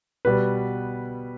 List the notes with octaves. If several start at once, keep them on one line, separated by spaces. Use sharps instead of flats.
B2 G3 B3 B4